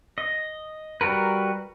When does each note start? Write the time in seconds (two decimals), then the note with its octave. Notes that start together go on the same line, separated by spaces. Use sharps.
0.18 D#5
1.01 G3 F#4 A#4 B4